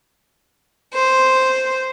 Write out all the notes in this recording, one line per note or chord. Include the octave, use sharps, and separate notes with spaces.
C5